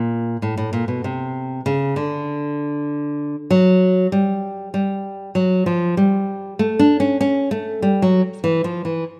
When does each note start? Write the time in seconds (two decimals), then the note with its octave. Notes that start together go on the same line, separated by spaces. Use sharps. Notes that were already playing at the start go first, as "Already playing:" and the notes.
Already playing: A#2
0.42 A2
0.57 A2
0.73 A#2
0.88 B2
1.04 C3
1.66 C#3
1.96 D3
3.50 F#3
4.12 G3
4.74 G3
5.35 F#3
5.66 F3
5.97 G3
6.59 A3
6.79 D4
7.00 C#4
7.21 C#4
7.51 A3
7.82 G3
8.02 F#3
8.44 E3
8.64 F3
8.85 E3